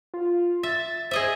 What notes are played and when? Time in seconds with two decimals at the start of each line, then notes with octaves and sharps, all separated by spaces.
0.14 F4
0.63 E5 A6
1.11 G#4 C5 D#5 E5